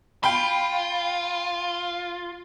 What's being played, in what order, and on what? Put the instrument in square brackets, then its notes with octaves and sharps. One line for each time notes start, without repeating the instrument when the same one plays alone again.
[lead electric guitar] F4 [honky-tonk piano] G5 B5